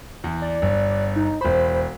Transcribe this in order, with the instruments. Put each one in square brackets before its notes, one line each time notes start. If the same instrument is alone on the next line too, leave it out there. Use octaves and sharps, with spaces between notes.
[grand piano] E2
[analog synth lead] D5
[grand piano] G1
[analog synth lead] D#4
[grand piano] E1 B5 [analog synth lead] C5